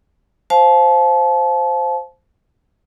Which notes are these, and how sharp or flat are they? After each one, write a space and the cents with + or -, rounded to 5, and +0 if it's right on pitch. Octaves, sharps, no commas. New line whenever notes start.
C5 +0 F5 +0 A5 -30